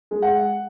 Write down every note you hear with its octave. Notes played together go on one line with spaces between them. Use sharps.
G#3
F#5